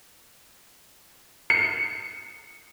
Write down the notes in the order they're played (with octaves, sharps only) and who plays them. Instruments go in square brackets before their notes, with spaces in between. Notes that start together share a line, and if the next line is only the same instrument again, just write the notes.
[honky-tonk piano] C#7